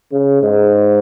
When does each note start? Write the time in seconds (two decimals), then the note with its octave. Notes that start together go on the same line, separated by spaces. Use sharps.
0.12 C#3
0.42 G#2